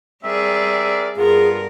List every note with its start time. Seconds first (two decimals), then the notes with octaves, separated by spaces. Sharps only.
0.24 G3 C4 G#4 A#4 D5 E5
1.17 G2 B3 F4 G#4 A#4